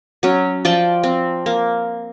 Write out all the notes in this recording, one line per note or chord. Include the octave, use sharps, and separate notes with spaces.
F#3 C#4
F3 D5 G5 A5
C4
A#3